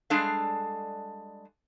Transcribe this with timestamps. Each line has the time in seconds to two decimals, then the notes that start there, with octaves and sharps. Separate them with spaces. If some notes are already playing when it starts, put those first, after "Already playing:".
0.10 G3 G#3 D4 G#4 A4 F5